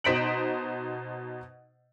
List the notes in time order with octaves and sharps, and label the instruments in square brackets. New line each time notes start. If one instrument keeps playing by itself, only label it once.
[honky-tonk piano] B2 D#4 C5 B6 D7 F#7